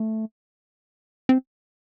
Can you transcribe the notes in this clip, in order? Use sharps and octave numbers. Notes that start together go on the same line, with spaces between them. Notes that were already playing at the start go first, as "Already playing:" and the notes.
Already playing: A3
C4